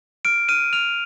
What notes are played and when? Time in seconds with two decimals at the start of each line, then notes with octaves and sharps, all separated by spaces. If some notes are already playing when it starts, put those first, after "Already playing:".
0.25 F6 D7
0.49 F6 D#7
0.73 F6 F7